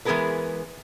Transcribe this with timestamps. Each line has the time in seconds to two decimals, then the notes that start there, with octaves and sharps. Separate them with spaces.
0.05 E3 G#3 B3 G#4 A#4 B4